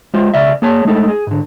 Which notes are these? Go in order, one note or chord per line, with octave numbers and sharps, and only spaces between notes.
G#3 F4 C5
B1 C#3 D5 E5
A#3 G#4 C#5 A5
G#3 A3 D#4 A4
G#4
G#2 D3